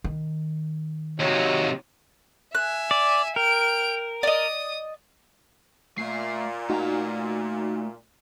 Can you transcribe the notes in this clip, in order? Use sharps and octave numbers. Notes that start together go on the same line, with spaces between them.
D#3
D#2 C3 D#4 F#4 C#5
E5 G#5 F#6
D5
A#4 G5 D7
D5 D#5 D#6
A#2 A3 E5 C7
A3 D#4 F#4 A#5